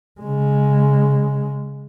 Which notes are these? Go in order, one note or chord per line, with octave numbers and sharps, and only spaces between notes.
C#3 G#3